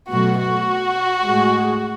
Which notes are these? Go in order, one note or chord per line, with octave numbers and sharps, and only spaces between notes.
B2 F#3 A3 F#4
F#4
A2 G#3